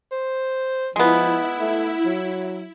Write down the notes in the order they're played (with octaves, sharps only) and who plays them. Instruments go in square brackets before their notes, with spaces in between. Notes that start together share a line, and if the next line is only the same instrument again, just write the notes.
[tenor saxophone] C5
[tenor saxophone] F3 [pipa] G#3 B3 [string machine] E4
[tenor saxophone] A3
F#3